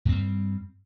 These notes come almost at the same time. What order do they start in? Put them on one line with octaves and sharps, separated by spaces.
G2 C4 G3